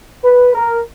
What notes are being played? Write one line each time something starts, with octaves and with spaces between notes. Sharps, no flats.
B4
A#4